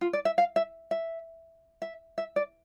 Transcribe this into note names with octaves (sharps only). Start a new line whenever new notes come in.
F4
D5
E5
F5
E5
E5
E5
E5
D5